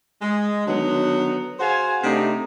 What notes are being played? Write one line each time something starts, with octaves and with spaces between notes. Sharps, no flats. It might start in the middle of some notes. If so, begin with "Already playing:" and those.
G#3
D3 D#3 F#3 B3 D#4
F#4 G#4 C5 F5 G#5
C3 A3 C4 D4 D#4